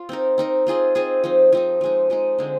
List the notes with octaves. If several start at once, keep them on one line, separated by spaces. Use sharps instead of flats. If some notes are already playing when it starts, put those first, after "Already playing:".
Already playing: F4
C4 D#4 A#4
C4 D#4 A#4
C4 F4 G#4 D#5
C4 F4 G#4 D#5
F3 C4 D#4
F3 C4 D#4
F3 G#3 D#4
F3 G#3 D#4
D3 G#3 C4